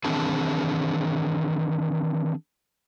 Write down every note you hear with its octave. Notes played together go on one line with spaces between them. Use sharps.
D#3 E3 C4 D4 G#4 A5